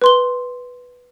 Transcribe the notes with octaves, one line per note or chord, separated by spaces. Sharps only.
B4 C6 G7